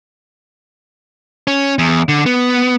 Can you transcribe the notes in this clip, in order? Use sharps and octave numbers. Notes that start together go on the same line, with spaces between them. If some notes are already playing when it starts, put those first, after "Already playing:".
C#4
E2
D3
B3